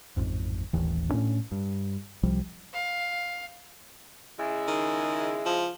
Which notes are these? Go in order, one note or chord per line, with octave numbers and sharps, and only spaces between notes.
A1 F2 G#2
D#1 A1 D#2 E3
A2 C#4 D4
G2
C2 C3 F3 G3
F5
C#3 G#3 E4
D#3
F3